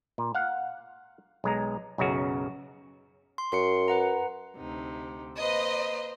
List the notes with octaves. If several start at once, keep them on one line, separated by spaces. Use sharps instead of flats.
A#2
F5 F#5
B1 G#3 A#5
B1 F#2 C#3 F#4
C6
F#2 C6 C7 C#7
B4 F#5 A#5
D2 C3 D#4
A#3 B4 C5 D#5 A#5